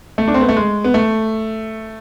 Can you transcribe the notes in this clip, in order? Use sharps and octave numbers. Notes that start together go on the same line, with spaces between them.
A3
D4
C4
B3
A3
G#3
B3
A3